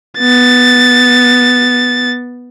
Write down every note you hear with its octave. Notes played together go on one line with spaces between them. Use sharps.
B3 A6